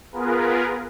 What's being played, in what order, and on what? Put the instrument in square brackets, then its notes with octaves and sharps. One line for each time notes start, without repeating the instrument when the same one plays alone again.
[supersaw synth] B3 F4 G#4 A#4 B4